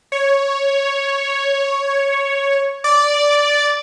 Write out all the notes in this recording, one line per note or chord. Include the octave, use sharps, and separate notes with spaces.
C#5
D5